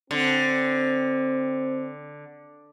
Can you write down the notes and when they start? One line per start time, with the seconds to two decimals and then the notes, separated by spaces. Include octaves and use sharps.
0.11 D3 C4